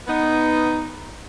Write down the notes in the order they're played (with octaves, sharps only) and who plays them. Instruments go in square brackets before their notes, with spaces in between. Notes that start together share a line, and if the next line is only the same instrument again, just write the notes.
[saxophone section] B3 D#4